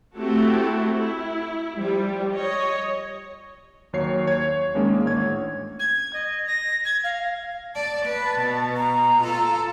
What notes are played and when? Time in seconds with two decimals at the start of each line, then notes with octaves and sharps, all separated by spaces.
0.16 A3 C4 E4 F#4 G4 A4
0.94 E4
1.77 F3 G3
2.34 C#5 D#5
3.93 D#2 F#3 C#5 C7
4.27 C#5 G#6
4.75 D#3 G#3 A#3 C#4 D4
5.05 A1 C#5 G#6
5.79 G#6
6.13 D#5
6.46 A#6
6.85 G#6
7.04 F5
7.75 D5 A5
8.06 B4
8.40 B2
8.77 A#5
9.21 F4 A4